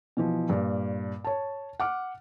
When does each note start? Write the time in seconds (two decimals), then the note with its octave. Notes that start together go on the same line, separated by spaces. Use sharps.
0.17 B2 E3 F3
0.50 G2 A#2
1.24 C#5 A5
1.80 F#5 D6 F6